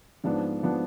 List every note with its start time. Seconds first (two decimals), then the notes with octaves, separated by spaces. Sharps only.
0.24 G#2 F3 B3 D4
0.63 F3 B3 D4